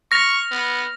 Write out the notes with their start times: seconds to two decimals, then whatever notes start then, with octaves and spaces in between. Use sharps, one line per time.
0.12 C#6 F6 A#6 F7
0.51 B3